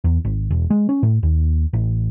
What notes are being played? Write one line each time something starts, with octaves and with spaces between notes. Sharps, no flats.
E2
G#1
E1
G#3
C#4
A2
D#2
A1